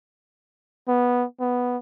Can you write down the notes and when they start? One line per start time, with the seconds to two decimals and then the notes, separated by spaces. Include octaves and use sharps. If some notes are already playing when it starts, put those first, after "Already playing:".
0.88 B3
1.40 B3